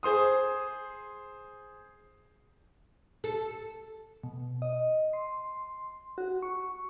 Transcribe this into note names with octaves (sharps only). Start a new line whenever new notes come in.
G#4 C5 C6 D#6
A4
B2
D#5
C6
F#4
C#6